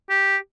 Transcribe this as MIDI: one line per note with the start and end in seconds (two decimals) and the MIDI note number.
0.10 0.37 67